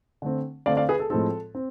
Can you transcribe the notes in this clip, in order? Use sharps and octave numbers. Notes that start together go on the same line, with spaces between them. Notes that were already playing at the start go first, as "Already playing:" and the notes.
D3 A3 C4
D3 A3 C4 D5 F5
D5 F5
G#4 B4
A4
A2 F3 G#3 C4 A4
C4